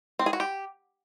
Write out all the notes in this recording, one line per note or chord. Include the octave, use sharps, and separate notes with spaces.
C4
G#4
F#4
G4